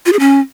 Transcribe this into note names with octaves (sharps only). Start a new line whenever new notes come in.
F4
G#4
C#4